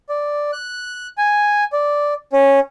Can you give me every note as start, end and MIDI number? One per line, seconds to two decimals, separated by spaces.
0.09 0.51 74
0.53 1.07 90
1.18 1.64 80
1.73 2.14 74
2.33 2.60 61